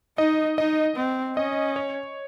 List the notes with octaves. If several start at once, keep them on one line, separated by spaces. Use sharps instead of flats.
D#4 D#5
D#4 D#5
C4
C#4 D#5
C#5